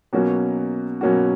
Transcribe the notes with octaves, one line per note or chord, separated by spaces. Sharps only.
B2 F#3 A#3 C#4 F#4
B2 F#3 A#3 C#4 F#4